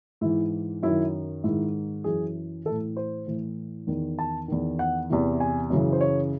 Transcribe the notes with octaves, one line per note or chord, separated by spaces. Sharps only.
G#2 E3 E4
F#2 D#3 E4
G#2 D#3 E4
F#2 E3 G#4
A2 E3 A4
C5
A2 E3
E2 D#3
A5
E2 D#3
F#5
E2 C3 E3
G#5
F#2 C#3 E3
C5
C#5